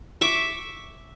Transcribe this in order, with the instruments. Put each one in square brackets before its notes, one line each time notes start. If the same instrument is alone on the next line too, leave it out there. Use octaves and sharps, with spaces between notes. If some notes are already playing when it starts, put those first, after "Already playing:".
[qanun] E5 C#6 D6